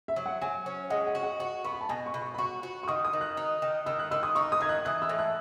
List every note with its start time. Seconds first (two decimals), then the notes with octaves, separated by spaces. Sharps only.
0.08 E5
0.16 F#3
0.26 F#5
0.42 F#3 G#5
0.66 C#4
0.90 G#3 F#5
1.07 F#5
1.15 F#4
1.23 F#5
1.39 F#4 F#5
1.64 B3 C#6
1.73 B5
1.81 A5
1.89 B2 G#5
2.06 C#6
2.14 B2
2.22 C#6
2.34 B5
2.38 F#4 C#6
2.63 F#4
2.83 C#6
2.88 D#3 D#6
3.05 D#6
3.13 D#3
3.21 F#6
3.37 D#4
3.62 D#3
3.86 D#3 E6
3.99 F#6
4.11 D#3 E6
4.23 D#6
4.35 D#4 C#6
4.52 D#6
4.61 D#3 G#6
4.69 F#6
4.85 E3 F#6
5.02 E6
5.09 A2
5.19 F#6